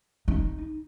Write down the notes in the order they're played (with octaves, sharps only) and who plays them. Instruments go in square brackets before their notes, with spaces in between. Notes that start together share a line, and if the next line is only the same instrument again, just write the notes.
[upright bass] D#4